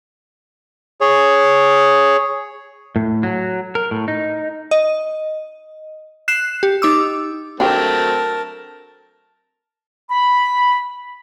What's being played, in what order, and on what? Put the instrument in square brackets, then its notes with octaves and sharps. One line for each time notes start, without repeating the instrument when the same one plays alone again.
[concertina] G#4 C#5
[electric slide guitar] A2
F#3
A#4
A2
D#4
[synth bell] D#5
F#6 C7 E7
G4
D#4 D6 E6
[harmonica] F#3 A3 C4 [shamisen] D4 G4 [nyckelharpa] A#4 A5
[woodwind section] B5